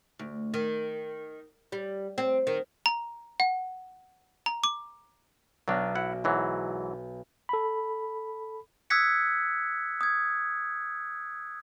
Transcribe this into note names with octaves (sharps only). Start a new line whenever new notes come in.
D2
D#3
G3
C4
D#3
A#5
F#5
A#5
D6
B1 F#3 D4 F6
E4 F#5
G#2 E3 F#3
A4 B5
D#6 E6 F#6 G#6 B6 C#7
D#6 G#6